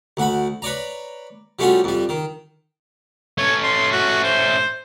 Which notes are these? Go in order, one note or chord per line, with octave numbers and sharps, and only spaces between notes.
D2 F#4 B5
B4 C#5 D5 A#5
F3 G3 A3 C#4 F#4
F2 G3
D#3
A3 C#4 C#5
C6
F#4
C5